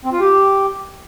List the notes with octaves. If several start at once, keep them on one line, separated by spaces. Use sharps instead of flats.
C4
F4
G4